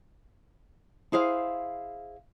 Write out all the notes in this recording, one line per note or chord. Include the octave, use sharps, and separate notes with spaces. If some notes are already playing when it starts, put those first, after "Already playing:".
E4 G#4 C5 F5